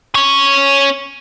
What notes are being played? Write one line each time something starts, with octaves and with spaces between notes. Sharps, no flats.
C#4 C#5